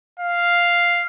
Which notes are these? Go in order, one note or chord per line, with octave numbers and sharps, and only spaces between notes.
F5